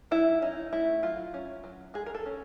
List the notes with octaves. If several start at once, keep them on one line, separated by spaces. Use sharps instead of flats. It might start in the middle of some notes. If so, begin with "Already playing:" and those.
F#3 E4
C#4 D#4
A3 E4
F#3 F4
C#4
F#3
G#3 G#4
A#4
A4
C#4